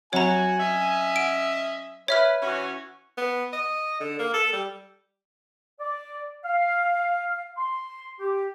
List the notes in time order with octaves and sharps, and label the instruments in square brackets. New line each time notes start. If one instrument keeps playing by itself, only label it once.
[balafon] F#3 C4 F#5 [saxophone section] F#4 [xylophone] C#5 A#5 [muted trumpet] G#5
[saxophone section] C#4 D#5 E5
[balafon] F#5 [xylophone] D7
[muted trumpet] B4 [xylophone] C#5 E5 F6
[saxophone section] E3 C#4 [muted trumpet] F#4
[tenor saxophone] B3
D#5
D3
A#3
A4
G3
[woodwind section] D5
F5
C6
G4